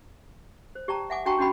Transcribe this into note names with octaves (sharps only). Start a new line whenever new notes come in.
C5
G4 D5 G5 A5 A#5
E5 F#5 G#5 D6
D4 F#4 G5 A5 A#5 C#6
C#4 D#4 F#4 G5 B5